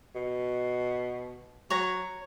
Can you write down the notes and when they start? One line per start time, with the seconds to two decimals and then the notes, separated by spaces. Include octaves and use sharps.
0.15 B2
1.70 F#3 C#5 A#5